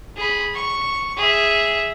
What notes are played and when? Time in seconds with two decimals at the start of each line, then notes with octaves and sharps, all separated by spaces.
0.17 G#4 B5
0.54 C#6
1.17 G#4 E5